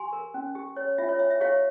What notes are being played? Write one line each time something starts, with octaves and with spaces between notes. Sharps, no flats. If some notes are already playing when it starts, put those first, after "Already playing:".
Already playing: G4 G#5 C6
A#4
C#4
G4
C#5
F4 E5
C#5
C#5 E5
E5
G4 C#5 F5